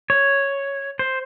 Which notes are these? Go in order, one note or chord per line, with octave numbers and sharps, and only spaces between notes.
C#5
C5